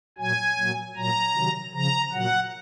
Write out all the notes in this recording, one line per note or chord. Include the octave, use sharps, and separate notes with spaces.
A#2 F#3 G#5
A#2 F#3
A#2 F#3 A#5
C3 D#3 F#3
C#3 F3 A#5
A#2 F#3 F#5